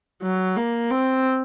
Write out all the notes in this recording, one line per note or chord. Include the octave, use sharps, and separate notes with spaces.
F#3
A#3
C4